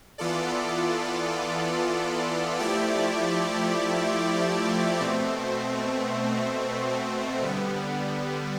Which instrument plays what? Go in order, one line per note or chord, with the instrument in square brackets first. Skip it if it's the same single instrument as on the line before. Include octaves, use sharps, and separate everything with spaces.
[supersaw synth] E3 B3 F4 A4 D5
F3 A3 E4 G4 D5
B2 A3 C4
D3 G3 B3